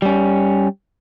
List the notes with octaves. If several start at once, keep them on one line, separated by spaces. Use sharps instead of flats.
G3 C#4